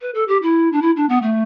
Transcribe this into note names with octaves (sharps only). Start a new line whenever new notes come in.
B4
A4
G4
E4
D4
E4
D4
B3
A3